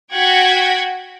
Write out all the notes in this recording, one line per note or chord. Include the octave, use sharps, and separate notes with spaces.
F#4 F#5 G5 G#6 B6